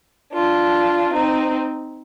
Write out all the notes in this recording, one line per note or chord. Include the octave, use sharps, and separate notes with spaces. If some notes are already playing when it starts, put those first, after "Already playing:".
D4 F4
C4 D#4